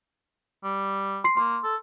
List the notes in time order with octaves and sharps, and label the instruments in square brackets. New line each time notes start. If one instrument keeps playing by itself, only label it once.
[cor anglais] G3
[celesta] C6 C7
[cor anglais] A#3 [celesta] C6
[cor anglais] A4